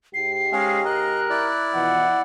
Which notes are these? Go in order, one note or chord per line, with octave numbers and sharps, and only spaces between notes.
G#2 G4 C7
G#3 C#4 F5
A#4 D#5 F#6
E4 D5
B2 E3 F3 F#5